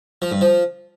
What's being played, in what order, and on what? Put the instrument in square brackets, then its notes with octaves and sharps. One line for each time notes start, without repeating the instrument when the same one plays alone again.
[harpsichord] F3
G2
F3